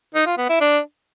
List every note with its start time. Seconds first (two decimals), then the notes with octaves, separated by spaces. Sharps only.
0.15 D#4
0.26 F4
0.38 B3
0.49 E4
0.61 D4